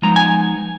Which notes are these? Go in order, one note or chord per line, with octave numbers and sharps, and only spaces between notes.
F3 G#3 B3 D#4 A#5
G#5